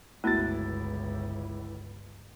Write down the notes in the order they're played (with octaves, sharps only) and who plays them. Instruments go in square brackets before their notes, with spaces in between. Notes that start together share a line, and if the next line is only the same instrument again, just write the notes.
[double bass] G1 C#2 [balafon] A3 B3 F#4 [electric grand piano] E4 A6